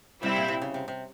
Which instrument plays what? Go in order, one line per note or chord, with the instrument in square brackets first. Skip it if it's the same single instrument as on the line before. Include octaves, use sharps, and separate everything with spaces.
[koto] C3 [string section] G3 C4 E4
[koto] A#2
C3
C#3
C3
C3